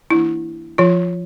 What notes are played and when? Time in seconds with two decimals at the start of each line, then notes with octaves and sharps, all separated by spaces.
0.10 E3 A#3 D4 E4
0.78 F3 F4